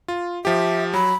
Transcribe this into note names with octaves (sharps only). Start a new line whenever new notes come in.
F4
F3 G4 E5
F#3 B5